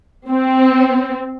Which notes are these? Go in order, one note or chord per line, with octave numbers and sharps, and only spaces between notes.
C4